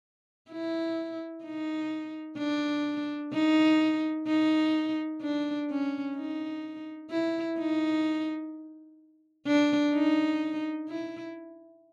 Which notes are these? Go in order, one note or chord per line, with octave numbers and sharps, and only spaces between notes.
E4
D#4
D4
D#4
D#4
D4
C#4
D#4
E4
D#4
D4
D#4
E4